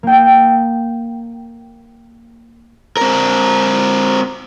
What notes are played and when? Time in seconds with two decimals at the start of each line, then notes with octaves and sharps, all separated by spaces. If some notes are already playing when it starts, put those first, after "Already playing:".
0.03 A#3 G5
2.97 C4 A#4